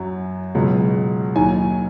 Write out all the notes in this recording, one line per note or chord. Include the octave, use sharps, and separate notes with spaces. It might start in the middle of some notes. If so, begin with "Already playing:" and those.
Already playing: F#2 F#3
C#2 B2 F#3
D#2 D#3 F#3 G#5